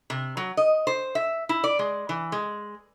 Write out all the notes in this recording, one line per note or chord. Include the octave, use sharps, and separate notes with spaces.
C3
F#3
D#5
C5
E5
E4
D5
G#3
E3
G#3